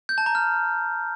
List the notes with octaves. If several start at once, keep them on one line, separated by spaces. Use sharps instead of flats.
G6
A5
A#5
F6